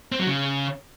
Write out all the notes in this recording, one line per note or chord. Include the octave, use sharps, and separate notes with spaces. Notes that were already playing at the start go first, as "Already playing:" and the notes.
C4
F#3
C#3